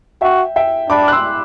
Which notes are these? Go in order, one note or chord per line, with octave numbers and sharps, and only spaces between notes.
F#4 E5 G5
E5 G5
D4 B5 D6
F#6
C6 E6